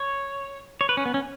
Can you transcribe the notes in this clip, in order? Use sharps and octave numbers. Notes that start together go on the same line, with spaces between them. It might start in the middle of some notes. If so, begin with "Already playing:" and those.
Already playing: C#5
C#5
B4
C#4
B3
C#4